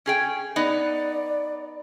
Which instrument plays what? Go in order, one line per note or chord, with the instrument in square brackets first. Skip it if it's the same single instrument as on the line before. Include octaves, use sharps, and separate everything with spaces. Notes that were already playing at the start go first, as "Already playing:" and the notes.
[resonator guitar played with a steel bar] C#4 G#4 G5
[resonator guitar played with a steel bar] B3 D#4 [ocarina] D5